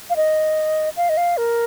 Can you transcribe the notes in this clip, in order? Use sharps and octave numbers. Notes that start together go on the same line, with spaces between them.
F5
D#5
F5
D#5
F5
A#4